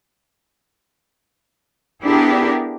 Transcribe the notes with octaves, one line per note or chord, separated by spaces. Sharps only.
B3 D4 E4 G4 G#4 A#4